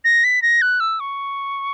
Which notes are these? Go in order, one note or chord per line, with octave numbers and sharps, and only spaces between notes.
A#6
B6
A#6
F#6
E6
C#6